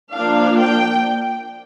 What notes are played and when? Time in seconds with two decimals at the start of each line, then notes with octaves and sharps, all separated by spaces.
0.13 F3 A#3 D4 F5
0.58 G5